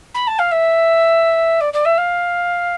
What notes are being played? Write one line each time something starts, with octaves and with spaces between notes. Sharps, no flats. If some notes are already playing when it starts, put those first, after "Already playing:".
B5
A5
F5
E5
D5
D5
E5
F5